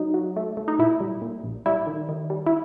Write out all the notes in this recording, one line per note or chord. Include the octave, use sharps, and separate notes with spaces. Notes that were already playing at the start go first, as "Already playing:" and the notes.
Already playing: F#3 D#4
F#3
A3
A3
D#4
A#2 E4
G3
A#2
A#1
G3 E4
D#3
D#3
G3
E4